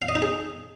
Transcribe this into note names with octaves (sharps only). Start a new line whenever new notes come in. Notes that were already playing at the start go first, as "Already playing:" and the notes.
F5
D#5
D#4
G#4